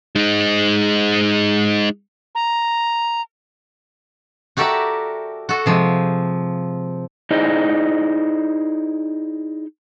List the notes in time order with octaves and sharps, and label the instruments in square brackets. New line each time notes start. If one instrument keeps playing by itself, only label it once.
[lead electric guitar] G#3 D#4
[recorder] A#5
[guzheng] F#4 G4 A4 A#4 D5 E5
F#4 A4
C3 F3 G#3
[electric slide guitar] D#4 E4 G#4 C5 D5 D#5